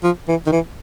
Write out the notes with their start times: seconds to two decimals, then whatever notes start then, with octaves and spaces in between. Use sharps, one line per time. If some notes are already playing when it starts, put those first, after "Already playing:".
0.03 F3
0.28 E3
0.46 D#3
0.52 E3